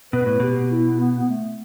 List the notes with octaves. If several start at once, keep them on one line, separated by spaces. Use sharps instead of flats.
B2 B4
A2
B2 G4
E4
B3
B3
A3